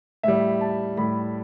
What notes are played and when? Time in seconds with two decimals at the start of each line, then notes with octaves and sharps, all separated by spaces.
0.23 A2 G3 E5
0.61 A5
0.97 A2 G3 B5